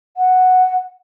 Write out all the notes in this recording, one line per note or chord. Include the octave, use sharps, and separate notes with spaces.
F#5